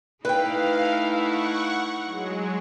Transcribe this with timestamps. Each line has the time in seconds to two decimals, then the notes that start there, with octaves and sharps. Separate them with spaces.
0.25 A3 D#4 E4 B4 F5 G5
1.07 F#5 C#6
2.04 F#3 G#3